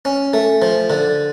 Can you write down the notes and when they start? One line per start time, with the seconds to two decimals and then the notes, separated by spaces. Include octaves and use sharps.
0.05 C#4
0.33 A3
0.62 F3
0.90 D3